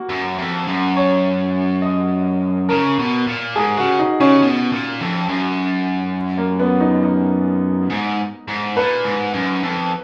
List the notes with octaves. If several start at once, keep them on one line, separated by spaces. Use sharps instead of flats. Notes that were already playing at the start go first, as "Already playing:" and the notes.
Already playing: A#3 F#4
F#2
F2
F#2
C#5
D#5
C#3 A#4
B2
A#2
G#2 G#4
C#3 F#4
D#4
C#3 C#4
B2
A#2
F2
F#2
A#3
B3
D#4
D#4
G#2
G#2
A#2 B4
G#2
F#2
F2